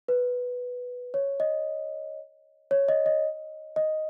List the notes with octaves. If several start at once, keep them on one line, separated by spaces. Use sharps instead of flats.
B4
C#5
D#5
C#5
D#5
D#5
D#5